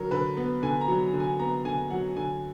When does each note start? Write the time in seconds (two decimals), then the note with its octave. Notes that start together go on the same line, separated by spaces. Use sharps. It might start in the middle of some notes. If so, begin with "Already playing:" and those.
Already playing: D3 F#3 A#4
0.11 D3 B4
0.37 B3
0.63 D3 G#5
0.81 A#5
0.88 F#3
1.13 D3
1.20 G#5
1.39 B3 A#5
1.65 D3 G#5
1.90 F#3 F#5
2.16 D3 G#5